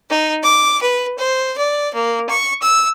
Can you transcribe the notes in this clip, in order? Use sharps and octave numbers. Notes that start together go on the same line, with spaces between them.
D#4
D6
B4
C5
D5
A#3
C#6
E6